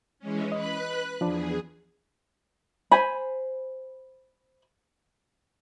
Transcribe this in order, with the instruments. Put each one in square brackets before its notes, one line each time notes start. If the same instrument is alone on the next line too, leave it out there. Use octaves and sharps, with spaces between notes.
[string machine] E3 G#3 C#4
[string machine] B4 B5 F#6 [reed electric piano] D#5
[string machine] E2 G#4 [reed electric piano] F3 D4
[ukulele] C5 G#5 B5